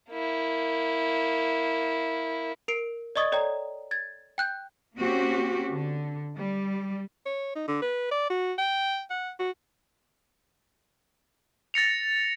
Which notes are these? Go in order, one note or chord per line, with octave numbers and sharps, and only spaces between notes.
A#3 E4
A#4 C7 D7
D5 D#5 C#6 D#6 G#6 A6
A4 C#5 D5 G5 A#5
G#6 A6
G5 F#6 G6
A#3 C4 C#4 F#4 G4
D3
G3
C#5
D#4
D3
B4
D5
F#4
G5
F#5
F#4
A6 A#6 C#7 F7